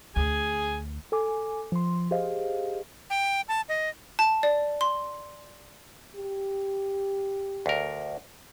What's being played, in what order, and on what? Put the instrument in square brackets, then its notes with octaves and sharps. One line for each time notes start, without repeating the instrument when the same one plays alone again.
[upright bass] D2 [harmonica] G#4 G#5
[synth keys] A4 G#5 D6
F3 C6
G4 G#4 C5 D#5 F5
[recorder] G5
A5
D#5
[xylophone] A5
D5
C6
[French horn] G4
[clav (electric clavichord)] D2 A#4